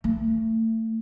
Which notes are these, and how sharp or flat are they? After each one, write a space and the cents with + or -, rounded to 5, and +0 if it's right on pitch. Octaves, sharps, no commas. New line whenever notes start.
A3 +30